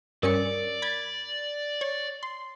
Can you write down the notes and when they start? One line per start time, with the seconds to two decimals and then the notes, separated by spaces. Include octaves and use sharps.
0.23 G2 C#4 A#4 D5 C#7
0.82 B5 G#6 A6
1.81 C#5
2.23 C6